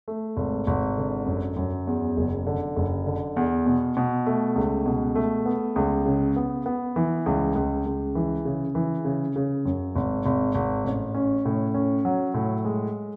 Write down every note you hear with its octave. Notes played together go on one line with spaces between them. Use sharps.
A3
G#1
G#1
D3
F#2
F#2
E2
F#1
D3
F#1
D3
E2
B2
B2
A3
C#2
B2
A3
B3
C#2
C#3
B3
B3
E3
C#2
C#2
C#2
E3
C#3
E3
C#3
C#3
F#2
G#1
G#1
G#1
A1
C#4
A2
C#4
F#3
A2
G#3